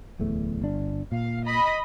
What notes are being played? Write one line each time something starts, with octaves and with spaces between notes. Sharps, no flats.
D1 E2 A3
G1 D4
A#2 F5
D#5 B5